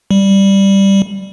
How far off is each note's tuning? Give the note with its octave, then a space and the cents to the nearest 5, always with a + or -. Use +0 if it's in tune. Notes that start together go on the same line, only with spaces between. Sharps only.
G3 +0